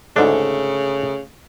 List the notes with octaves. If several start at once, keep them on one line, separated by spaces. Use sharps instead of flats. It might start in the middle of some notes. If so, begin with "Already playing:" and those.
D2 G#2 C#3 A3 D4